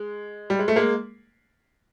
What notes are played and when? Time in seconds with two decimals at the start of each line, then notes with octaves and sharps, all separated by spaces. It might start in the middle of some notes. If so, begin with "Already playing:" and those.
Already playing: G#3
0.50 G3
0.59 G#3
0.68 A3
0.76 G#3 A#3